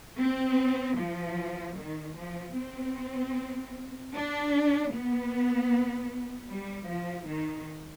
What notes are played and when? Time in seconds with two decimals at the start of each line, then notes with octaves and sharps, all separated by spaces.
0.19 C4
0.97 F3
1.77 D#3
2.16 F3
2.56 C4
4.13 D4
4.92 B3
6.49 G3
6.88 F3
7.27 D#3